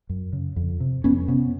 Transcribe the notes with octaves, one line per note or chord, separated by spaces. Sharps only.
F#2
C#3
F2
C3
F2 B3 C#4
C3 B3 C#4